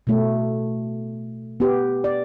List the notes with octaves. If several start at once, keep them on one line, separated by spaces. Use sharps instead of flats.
B2 A3
B3 G4
D5